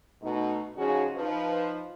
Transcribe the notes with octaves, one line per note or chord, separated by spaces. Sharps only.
B2 A3 D#4
C#3 F3 C#4 D#4 F#4 G#4
F3 D#4 B4